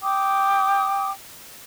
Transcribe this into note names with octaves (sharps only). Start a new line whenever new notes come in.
G5 D6 D#6